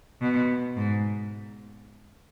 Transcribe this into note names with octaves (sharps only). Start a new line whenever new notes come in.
B2
G#2